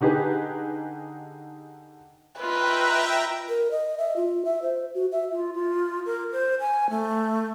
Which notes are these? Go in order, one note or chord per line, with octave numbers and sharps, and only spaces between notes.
D3 D#4 G4 G#4 B4
F4 B4 D#5 E5 G5 A#5
A#4
D#5
E5
F4
E5
C5
F#4
E5
F4
F4
A#4
C5
G#5
A3